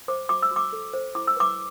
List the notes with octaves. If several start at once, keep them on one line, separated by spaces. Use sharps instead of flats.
C5 D6
F#4 D6
E6
F#4
D6
A4
C5
E4 D6
E6
B4 D6